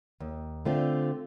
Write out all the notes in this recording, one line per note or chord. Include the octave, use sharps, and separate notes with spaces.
D#2
D3 A3 C4 F4